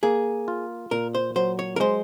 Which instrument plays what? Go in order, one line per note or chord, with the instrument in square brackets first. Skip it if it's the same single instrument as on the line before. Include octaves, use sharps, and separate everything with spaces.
[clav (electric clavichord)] A#3 [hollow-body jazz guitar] G#4
[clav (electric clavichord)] F4
[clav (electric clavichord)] A#2 [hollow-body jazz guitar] A#4
[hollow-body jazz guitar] C5
[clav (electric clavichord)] F#3 [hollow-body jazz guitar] C5
[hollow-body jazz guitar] C#5
A#4
[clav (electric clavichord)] G#3 [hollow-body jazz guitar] C5